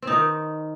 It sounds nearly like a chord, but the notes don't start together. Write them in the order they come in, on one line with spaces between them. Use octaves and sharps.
C4 D#4 D#3